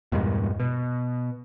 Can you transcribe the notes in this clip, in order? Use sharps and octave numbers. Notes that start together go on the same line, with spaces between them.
E2 G2 A#2 G#3
B2